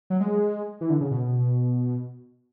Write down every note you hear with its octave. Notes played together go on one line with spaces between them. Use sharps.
F#3
G#3
E3
D3
C#3
B2